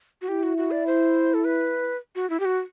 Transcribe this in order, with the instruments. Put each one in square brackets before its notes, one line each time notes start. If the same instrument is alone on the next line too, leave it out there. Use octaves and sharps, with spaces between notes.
[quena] F#4
[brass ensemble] E4 [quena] G4
[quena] F#4
F#4
D5
C5
A4
B4
F#4
E4
G4
F#4